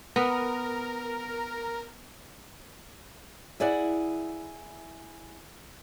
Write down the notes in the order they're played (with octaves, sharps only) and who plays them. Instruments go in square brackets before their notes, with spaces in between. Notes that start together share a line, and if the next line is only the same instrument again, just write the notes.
[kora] B3 B4 [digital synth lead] A#4
[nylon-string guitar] E4 G#4 D5 E5 F#5